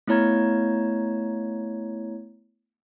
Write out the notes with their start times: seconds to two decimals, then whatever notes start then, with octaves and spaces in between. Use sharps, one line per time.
0.08 A3 B3 E4 C#5 A#5 G#6